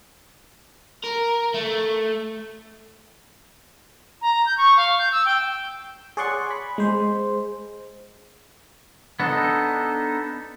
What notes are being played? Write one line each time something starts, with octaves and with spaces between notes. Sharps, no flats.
A#4
A3
A#5
G6
C#6
F5
G6
E6
G5
G#4 C#5 D5 F#5 C6 C#6
B5
G#3 C5
B3 D4 D#4 A4 D#5